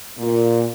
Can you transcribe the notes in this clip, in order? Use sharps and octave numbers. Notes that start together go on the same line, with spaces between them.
A#2